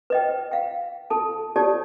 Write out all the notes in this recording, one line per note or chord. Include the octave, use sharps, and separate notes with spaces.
B4 D#5 G5
F5 G5
A4 A5
G4 A4 C#5 D5 A5